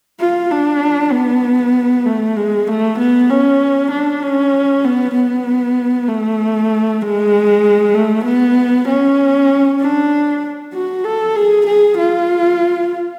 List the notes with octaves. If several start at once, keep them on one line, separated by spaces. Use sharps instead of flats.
F4
D4
B3
A3
G#3
A3
B3
C#4
D4
C#4
B3
B3
A3
G#3
A3
B3
C#4
D4
F#4
A4
G#4
G#4
F4